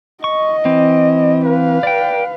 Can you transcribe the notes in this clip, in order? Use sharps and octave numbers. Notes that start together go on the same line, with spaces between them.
D#5 C#6
E3 C4
B4 F5
D5 G5